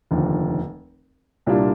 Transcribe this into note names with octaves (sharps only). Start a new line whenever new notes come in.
F1 D#2 D3 F3
C2 A#2 G3 D4 F4